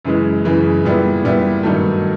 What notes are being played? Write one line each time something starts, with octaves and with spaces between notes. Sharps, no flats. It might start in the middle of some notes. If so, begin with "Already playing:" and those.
F#2 C#3 E3 G#3
F#2 C#3 E3 G#3
A#2 G3 B3 E4
A#2 G3 B3 E4
G2 D#3 F#3 A3